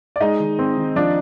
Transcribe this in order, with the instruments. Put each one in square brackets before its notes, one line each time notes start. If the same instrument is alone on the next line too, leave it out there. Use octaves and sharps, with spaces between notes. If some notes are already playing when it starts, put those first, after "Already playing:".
[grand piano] D5
[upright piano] G#3 [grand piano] D#4 D#5
[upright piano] D#3
C4
D#3
[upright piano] F3 [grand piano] D4 D5